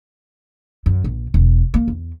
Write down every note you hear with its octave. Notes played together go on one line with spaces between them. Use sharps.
F#2
A#1
E1
A#3
E2